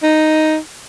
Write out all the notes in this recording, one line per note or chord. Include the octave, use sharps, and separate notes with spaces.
D#4